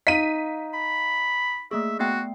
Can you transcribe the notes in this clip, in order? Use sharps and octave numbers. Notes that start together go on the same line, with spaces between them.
D#4 F5 B6 D#7
B5
A3 A#3 G#4 E5
A3 B3 F#4 G5